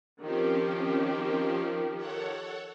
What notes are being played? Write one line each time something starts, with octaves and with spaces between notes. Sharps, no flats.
D#3 F3 C4 C#4 G4
A4 C#5 F#5